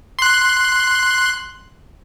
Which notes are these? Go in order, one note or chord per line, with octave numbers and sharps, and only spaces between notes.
C6 F#6